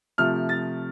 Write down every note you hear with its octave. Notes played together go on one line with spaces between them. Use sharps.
C3 F3 A3 F6
A6